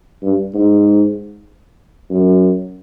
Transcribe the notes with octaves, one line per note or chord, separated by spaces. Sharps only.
G2
G#2
F#2